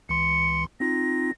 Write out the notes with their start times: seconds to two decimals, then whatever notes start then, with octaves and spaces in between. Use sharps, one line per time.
0.09 C#2 E3 C6 C#7
0.80 C4 D#4 F4 A#6